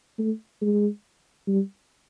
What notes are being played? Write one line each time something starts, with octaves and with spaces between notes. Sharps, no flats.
A3
G#3
G3